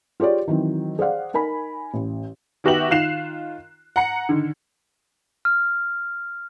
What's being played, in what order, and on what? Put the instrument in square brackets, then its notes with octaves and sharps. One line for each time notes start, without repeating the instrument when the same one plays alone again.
[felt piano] F4 G4 G#4 C#5 D5
D#3 E3 F#3 C4
G#4 C5 D5 F5 F#5
D#4 A#4 G#5 B5
A1
[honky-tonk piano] D#3 B3 F#4 G4 E5 F#7
D#3 F4 F#6 C7 E7 F7
F#5 A#5 C#7
D3 D#3
[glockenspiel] F6